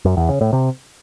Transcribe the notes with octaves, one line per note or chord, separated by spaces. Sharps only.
F#2
E2
C#3
A2
C3